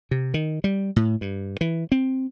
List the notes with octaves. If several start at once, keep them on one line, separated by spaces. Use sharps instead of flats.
C3
D#3
G3
A2
G2
E3
C4